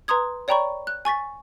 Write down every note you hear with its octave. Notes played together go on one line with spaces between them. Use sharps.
B4 A#5 C6 D#6 G#6
C#5 D5 G5 A#5 B5 C#6
F#6
G#5 C#6 A6 B6